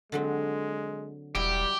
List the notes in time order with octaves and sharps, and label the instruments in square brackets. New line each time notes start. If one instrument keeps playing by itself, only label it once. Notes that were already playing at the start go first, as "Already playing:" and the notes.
[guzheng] D3 F#3 C4 [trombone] G#3
[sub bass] E1 [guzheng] F#3 E4 D#5 [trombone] G3 [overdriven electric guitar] G4